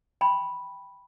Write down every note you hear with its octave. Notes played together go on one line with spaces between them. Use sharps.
G5 B5 C6